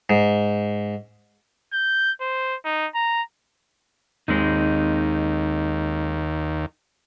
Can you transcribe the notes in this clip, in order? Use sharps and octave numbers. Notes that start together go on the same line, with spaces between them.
G#2
G6
C5
D#4
A#5
D#2 G#3 C4 D#4